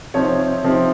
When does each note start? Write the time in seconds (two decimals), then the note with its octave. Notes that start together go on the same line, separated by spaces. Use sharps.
0.14 C3 F3 C4 D#4 C#5
0.63 C3 F3 C4 D#4